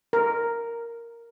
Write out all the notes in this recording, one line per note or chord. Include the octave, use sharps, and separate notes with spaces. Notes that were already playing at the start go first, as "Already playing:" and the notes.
A#4